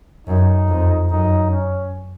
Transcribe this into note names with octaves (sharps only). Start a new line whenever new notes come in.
F#2 D#4
F2
F#2 D#4
C#4